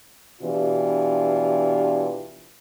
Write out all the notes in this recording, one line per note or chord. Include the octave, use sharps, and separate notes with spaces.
B2 E3 D4 F4 G4